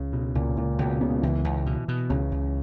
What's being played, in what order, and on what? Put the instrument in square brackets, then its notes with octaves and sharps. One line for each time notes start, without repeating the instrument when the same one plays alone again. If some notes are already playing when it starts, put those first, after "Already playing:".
Already playing: [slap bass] C#2 [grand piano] C#3
[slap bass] B2
[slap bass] C#2 [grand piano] A#2
[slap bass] C#2 [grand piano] A#2
[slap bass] C#2 [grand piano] B2
[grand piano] C#3 [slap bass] B3
[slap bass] C#2 [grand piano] E3
[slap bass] C#2
B2
B2
[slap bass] C#2 [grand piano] C#3
[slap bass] C#2